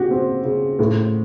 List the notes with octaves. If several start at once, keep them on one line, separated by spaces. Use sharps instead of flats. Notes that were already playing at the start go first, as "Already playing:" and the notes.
Already playing: C#3 F#4 G4
C4
C#3
A2